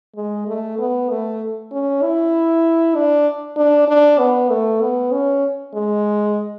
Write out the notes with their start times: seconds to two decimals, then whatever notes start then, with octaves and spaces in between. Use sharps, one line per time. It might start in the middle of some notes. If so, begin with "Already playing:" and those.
0.16 G#3
0.47 A3
0.79 B3
1.10 A3
1.72 C#4
2.03 E4
2.95 D4
3.57 D4
3.88 D4
4.19 B3
4.50 A3
4.81 B3
5.12 C#4
5.74 G#3